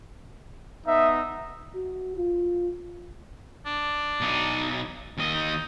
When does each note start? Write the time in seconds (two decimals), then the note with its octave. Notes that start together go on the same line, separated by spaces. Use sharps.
0.87 B3 D#4 E5 D#6
1.75 F#4
2.17 F4
3.66 D4
4.21 B1 D#4
5.18 D#2 D#5
5.33 D#4